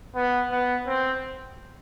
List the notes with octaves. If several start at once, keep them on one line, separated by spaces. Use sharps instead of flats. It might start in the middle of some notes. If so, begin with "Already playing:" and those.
B3
B3
C4